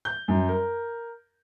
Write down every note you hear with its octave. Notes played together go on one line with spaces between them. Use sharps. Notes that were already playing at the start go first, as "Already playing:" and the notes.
G6
F#2
A#4